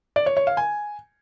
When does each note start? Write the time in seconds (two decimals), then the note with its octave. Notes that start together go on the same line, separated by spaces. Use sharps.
0.16 D5
0.26 C#5
0.37 C#5
0.47 F5
0.57 G#5